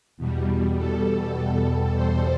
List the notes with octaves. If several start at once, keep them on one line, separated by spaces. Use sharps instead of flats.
E2 B2 G3
A4
C5